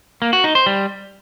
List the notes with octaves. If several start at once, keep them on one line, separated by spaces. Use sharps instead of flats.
A#3
F#4
D#4
C5
G3